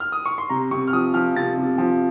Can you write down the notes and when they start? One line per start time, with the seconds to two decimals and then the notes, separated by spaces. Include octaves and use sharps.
0.00 F6
0.12 D#6
0.26 C#6
0.38 C6
0.49 C3 A#5
0.71 C3 C#6
0.87 F6
0.93 F3 D#6
1.14 F3 F6
1.36 C3 A6
1.57 C3
1.78 F3